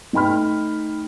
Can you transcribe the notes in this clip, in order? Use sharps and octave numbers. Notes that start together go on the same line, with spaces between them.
A3 D#4 G5 B5 F6